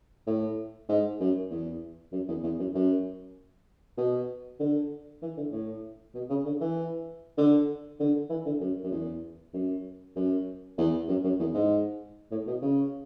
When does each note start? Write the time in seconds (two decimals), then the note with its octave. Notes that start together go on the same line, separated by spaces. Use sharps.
0.27 A2
0.89 G#2
1.20 F#2
1.50 E2
2.12 F#2
2.28 E2
2.43 E2
2.59 F#2
2.74 F#2
3.98 B2
4.60 D3
5.22 E3
5.37 D3
5.52 A2
6.14 B2
6.29 C#3
6.45 D3
6.61 E3
7.38 D3
8.00 D3
8.30 E3
8.46 D3
8.61 F#2
8.83 F#2
8.91 E2
9.54 F#2
10.16 F#2
10.78 E2
11.08 F#2
11.24 F#2
11.40 E2
11.54 G#2
12.31 A2
12.47 B2
12.62 C#3